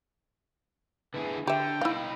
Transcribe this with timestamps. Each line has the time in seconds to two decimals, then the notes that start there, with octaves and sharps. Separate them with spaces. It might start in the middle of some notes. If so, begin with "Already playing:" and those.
1.14 D3 E4 G#4 B4
1.47 D3 G4 E5 G5
1.81 D#4 E4 B4 F5